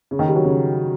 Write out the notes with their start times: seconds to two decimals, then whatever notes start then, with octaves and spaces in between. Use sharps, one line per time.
0.11 C#3
0.19 D#3
0.28 G3
0.35 F#3
0.45 C#3